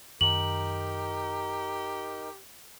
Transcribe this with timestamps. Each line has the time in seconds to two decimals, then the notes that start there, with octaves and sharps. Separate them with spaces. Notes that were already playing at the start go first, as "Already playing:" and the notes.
0.21 F#2 D#3 B3 D#4 G4 A#4 F#7